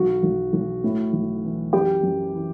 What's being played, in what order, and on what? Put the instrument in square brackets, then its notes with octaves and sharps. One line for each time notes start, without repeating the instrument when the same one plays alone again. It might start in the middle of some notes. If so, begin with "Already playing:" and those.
Already playing: [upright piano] B1 F#4
B1
B1
A2
B1
E3
F#2 G4
F#2
E3